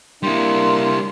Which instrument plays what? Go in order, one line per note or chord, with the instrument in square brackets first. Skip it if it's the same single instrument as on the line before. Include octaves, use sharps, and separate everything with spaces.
[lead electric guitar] G3 E4 [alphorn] A#3 [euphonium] D4 [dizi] C6